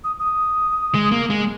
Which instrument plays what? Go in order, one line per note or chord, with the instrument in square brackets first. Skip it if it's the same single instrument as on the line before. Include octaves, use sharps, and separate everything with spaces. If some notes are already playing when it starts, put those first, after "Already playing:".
[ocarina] D#6
D#6
[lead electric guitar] G#3
A#3
G#3